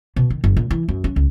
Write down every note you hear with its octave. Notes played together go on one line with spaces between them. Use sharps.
B2
D#3
F#1
A#2
E3
F#2
C#4
C#2